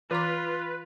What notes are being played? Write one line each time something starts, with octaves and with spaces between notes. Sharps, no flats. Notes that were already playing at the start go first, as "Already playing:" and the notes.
E3 F4 B4 A#5 D6